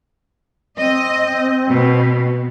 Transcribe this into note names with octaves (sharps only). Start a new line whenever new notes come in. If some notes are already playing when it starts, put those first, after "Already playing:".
C4 D#5
B2